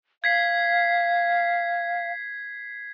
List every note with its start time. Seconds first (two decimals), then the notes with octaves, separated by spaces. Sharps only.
0.24 F5 G#6 B6 C7